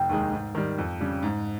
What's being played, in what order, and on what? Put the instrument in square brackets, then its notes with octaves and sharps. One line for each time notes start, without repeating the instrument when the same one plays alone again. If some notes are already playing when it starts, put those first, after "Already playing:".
Already playing: [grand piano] F1 [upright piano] G5
[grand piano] D#2 D#3 G#3 D#4
G#2
D#3 G3
F2
C#3 G3
G#2